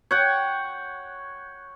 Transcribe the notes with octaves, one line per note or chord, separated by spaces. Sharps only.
C#5 F#5 G5